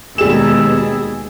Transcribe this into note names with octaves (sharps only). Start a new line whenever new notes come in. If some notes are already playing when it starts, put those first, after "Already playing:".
D#2 B2 G3 G#3 G#4 E6 E7